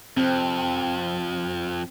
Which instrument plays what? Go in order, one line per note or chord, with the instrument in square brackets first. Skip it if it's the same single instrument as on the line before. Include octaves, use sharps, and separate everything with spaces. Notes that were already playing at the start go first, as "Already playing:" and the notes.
[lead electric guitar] F2 [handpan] C4